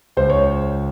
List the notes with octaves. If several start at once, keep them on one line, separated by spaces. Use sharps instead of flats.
C#2 C5
C#5